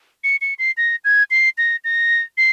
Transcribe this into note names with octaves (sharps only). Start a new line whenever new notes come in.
C#7
C#7
C7
A#6
G#6
C7
A#6
A#6
C7